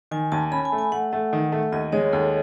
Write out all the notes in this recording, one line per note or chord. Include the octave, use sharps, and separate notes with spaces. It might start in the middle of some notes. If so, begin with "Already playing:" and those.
D#3 G#5
D#2 A5
C#4 B5
G#5
A3
G#5
A3 F#5
A3
D#3
A3
D#2 D#5
G#3 C#5
D#2 A4